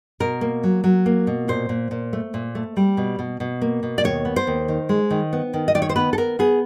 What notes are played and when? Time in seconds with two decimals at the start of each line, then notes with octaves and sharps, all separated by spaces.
0.20 B2 A#4
0.41 A#3
0.64 F#3
0.84 F#3
1.06 A#3
1.27 B2
1.48 A#2 C5
1.69 A#2
1.91 A#2
2.13 A3
2.34 A#2
2.55 A3
2.77 G3
2.97 B2
3.19 B2
3.40 B2
3.61 A#3
3.83 B2
3.98 D5
4.04 D#2 C#5
4.25 B3
4.36 C5
4.47 D#2
4.68 D#3
4.89 G#3
5.10 D#3
5.33 B3
5.54 D#3
5.68 D#5
5.75 D#3 D5
5.82 C#5
5.89 C5
5.96 B3 B4
6.13 A4
6.18 B3 A#4
6.39 B3 G#4